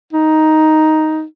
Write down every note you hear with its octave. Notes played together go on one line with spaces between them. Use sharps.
D#4